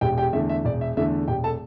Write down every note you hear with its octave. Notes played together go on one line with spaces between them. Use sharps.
E1 G4 G5
G4 G5
E2 D3 A3 E5
E5
E1 D5
E5
E2 D3 A3 E5
E1 G4 G5
A4 A5